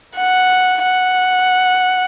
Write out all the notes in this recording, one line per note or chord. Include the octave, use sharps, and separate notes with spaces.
F#5
F#5